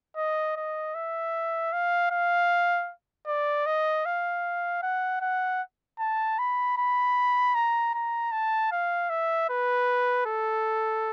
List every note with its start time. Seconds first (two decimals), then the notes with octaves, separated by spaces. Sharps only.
0.17 D#5
0.56 D#5
0.95 E5
1.73 F5
2.11 F5
3.27 D5
3.66 D#5
4.05 F5
4.83 F#5
5.21 F#5
5.99 A5
6.39 B5
6.78 B5
7.55 A#5
7.94 A#5
8.32 A5
8.72 F5
9.10 E5
9.49 B4
10.26 A4